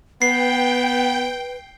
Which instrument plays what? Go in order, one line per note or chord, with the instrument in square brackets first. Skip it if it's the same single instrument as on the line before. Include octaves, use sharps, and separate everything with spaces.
[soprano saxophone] B3 [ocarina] B4 [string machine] G5 [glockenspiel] C7